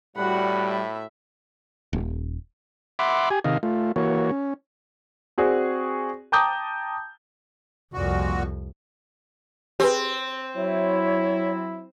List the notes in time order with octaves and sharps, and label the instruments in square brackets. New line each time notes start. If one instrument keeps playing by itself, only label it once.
[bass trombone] A2 [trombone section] G3 [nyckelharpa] F#4 F#5 [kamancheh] B5
[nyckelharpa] E5
[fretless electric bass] D#1
[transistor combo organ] E5 F#5 B5 C6 D6
G4 G#5
C3 D#3 D#5 F5
A3 F4
E3 A#3 F#4 C#5
C#4
[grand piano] C4 F#4 G#4 D5
G5 A5 A#5 D6 D#6 G6
[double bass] C2 F2 [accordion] A#2 F#4
[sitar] C4 [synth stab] G4 G#4 B4
[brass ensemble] F#3 E4 [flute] C#5